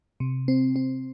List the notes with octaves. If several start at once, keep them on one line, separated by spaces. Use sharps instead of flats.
C3
C4
C4